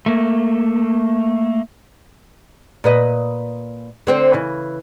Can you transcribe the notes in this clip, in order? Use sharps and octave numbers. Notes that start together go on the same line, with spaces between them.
A3 A#3
A#2 B4 D#5
D3 C4 C5
C#3 E3